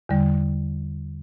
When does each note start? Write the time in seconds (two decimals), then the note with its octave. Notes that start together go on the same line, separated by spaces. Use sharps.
0.09 E2 D3 G3